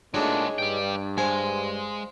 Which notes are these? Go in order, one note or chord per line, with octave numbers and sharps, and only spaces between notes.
A#2 G#3 A3 D4 D#4 F#4 G#4 C#5
G2 D5 G5
G#3 C5 F5 G#5